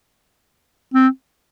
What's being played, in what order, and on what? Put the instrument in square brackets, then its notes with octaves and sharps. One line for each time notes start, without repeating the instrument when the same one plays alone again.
[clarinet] C4